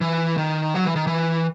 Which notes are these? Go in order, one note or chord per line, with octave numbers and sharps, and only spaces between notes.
E3
D#3
F#3
E3
D#3
E3